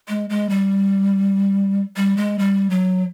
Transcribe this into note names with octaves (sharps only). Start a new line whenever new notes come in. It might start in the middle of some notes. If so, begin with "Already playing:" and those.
G#3
G#3
G3
G3
G#3
G3
F#3